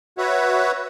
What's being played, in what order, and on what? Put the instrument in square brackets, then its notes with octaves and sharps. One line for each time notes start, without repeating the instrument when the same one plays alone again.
[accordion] F#4 B4 C#5 E5 F#5